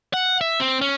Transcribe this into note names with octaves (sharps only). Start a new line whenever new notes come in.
F#5
E5
C4
C#4